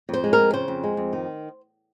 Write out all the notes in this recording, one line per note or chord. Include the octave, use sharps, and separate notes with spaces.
F2 C5
G#3
F2 A#4
C#3 C5
F2
G#3
F2
D#3